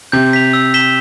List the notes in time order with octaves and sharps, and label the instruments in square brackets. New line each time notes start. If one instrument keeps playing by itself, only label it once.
[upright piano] C3 [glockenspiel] G6
[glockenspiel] B6 F7
E6
B6 E7 G7